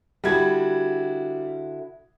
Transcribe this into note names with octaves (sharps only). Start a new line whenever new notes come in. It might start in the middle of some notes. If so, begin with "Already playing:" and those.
D3 G3 E4 F#4 G#6